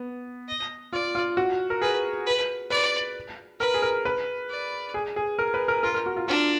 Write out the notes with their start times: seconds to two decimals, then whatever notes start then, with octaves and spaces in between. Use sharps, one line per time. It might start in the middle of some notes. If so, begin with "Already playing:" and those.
Already playing: B3
0.48 D#5
0.93 F4 D5
1.15 F4
1.37 F#4
1.70 A#4
1.82 G#4 B4
2.26 B4
2.70 B4 D5
3.60 A#4 B4
3.74 G#4
3.82 A#4
4.05 B4
4.50 D5
4.94 G#4
5.16 G#4
5.39 A#4
5.54 B4
5.68 A#4
5.83 F4 A#4
5.94 A#4
6.06 F#4
6.16 F4
6.28 D4 F4